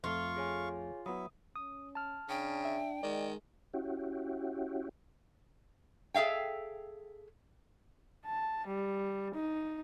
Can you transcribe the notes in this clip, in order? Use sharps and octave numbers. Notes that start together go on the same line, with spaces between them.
F2 A3 F4 F5 C#6
G#4 C#5 G#5
F#3 B3 E4 E5 D#6
C#4 D#6
A5 F6
C#3 D4 G5
E5
D#3 G#3 D5
C#4 E4 F#4 G4
G#4 A4 E5 F5 G5
A5
G3
D#4